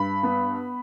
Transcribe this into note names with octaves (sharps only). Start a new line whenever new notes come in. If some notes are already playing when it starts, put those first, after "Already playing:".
Already playing: G2 B5
B3